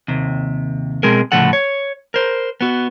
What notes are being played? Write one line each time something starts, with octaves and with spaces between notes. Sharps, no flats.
D#2 C3
B2 G#3 C4 G#4 A#4
C2 A2 C#3 F3 A4 F#5
C#5
A#4 C5
B3 F#4